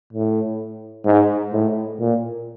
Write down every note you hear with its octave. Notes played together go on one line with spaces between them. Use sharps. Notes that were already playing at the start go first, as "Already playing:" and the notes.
A2
G#2
A2
A#2